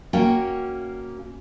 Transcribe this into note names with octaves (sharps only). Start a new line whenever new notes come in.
A#3 C#4 F#4 G5